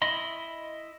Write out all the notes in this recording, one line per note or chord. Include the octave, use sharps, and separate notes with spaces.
E4 D#5 B5 C6